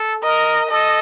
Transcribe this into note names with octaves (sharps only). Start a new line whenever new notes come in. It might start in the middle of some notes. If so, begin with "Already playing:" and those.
Already playing: A4
A#4 D#5
A4 D#5